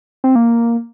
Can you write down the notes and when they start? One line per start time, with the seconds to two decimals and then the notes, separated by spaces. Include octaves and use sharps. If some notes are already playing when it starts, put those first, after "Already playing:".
0.24 C4
0.36 A#3